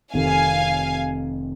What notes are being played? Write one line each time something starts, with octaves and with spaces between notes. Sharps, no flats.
F1 F2 C3 D#3 F5 G#5